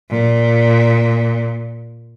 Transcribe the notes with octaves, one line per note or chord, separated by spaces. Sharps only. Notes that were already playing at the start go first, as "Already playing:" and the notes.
A#2